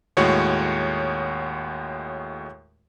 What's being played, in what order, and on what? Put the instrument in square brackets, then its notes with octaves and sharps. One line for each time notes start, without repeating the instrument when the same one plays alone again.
[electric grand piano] D#2 A2 G#3 F#4 C#5 F#5